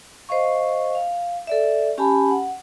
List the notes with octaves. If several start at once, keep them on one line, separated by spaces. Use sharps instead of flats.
C5 D#5 F5 C#6
F5
A4 D5 E5
C#4 G4 G#5 A5 B5
F#5